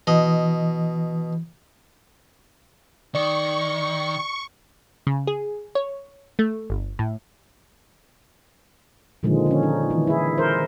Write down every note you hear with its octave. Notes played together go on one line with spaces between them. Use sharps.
B2 E3 D#5
D#3 D5 C#6
C#3
G#4
C#5
A3
G1
A2
A#2 D3 D#3 F3 G#3
D3 C#4
D#4
D#3 E3
E4 G#4
A#4 C5